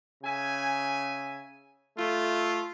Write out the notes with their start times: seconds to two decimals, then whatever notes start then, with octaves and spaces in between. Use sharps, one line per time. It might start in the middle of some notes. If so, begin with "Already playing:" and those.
0.24 C#3 E5 G#5
1.98 A3 F4